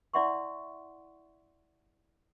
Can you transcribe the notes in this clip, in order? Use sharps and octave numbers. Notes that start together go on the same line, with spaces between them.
E4 D5 E5 F#5 C6 C#6